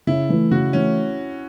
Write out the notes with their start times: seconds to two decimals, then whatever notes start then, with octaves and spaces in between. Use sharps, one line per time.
0.07 C#3 E4
0.29 E3 A3
0.51 C#3 F#4
0.73 E3 A3 C#4